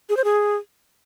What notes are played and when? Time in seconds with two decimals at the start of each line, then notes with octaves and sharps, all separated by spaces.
0.09 G#4
0.17 C5
0.24 G#4